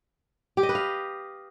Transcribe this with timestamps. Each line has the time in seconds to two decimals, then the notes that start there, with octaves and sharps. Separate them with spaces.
0.57 G4
0.63 D#5
0.69 B4
0.75 F5